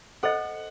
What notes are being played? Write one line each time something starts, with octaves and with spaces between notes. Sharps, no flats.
A4 C5 D#5 F#5